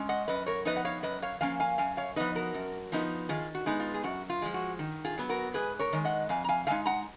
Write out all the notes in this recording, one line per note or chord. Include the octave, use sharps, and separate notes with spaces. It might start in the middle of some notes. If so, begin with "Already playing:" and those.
Already playing: G#3 C#4
D#5 F#5
F#2 B4 D#5
A#4 C#5
F3 B3 D#4 B4 D#5
F#5
C#5 F5
F#2 B4 D#5
C#5 F5
F3 A#3 C#4 F5 G#5
F5 G#5
F#2 F5 G#5
C#5 F5
F3 B3 D#4 B4 D#5
F#4 A#4
F#2
F3 B3 D#4
D#3 F4 G#4
F#4
G#3 B3 D#4
F4
G#4
F#2 F#4
F4
F3 G#3
F#4
D#3
F4 G#4
F#3 B3
F#4 A#4
G#2 G#4 B4
A#4 C#5
D#3 G#3
D#5 F#5
F2 F5 G#5
A#5
F5 G#5
D#3 G#3 D#4 F5 G#5
F#5 A#5